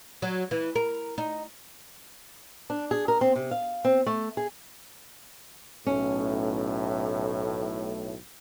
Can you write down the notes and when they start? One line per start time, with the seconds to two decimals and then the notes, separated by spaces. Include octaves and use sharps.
0.22 F#3
0.51 E3
0.75 A#4
1.18 D#4
2.70 D4
2.91 G#4
3.08 A#4
3.21 C4
3.36 C3
3.51 F5
3.85 C4
4.06 A3
4.37 G#4
5.87 B1 A2 C#4